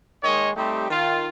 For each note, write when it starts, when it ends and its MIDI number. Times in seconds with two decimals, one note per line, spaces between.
0.23 0.49 51
0.23 0.49 56
0.23 0.49 58
0.23 0.49 73
0.23 0.49 75
0.56 0.84 55
0.56 0.84 57
0.56 0.84 60
0.56 0.84 63
0.56 0.84 67
0.89 1.28 51
0.89 1.28 65